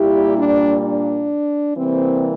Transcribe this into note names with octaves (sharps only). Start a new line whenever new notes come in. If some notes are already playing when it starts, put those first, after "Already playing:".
Already playing: A#2 G3 A#3 E4 G4
D4
D4
C3 E3 G3 A#3 C4